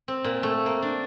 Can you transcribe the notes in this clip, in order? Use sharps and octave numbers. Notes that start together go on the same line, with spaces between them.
C4
A#2
A3
A#3
D4